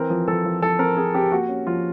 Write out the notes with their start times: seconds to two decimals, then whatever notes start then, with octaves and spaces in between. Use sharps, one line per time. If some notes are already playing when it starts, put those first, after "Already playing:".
Already playing: E3 C4 A#4
0.10 F3
0.28 F3 A4
0.45 F3
0.62 F3 A4
0.79 C4 A#4
0.97 C4 G#4
1.14 C4 G4
1.32 A#3 F#4
1.49 C#4
1.67 F3 F4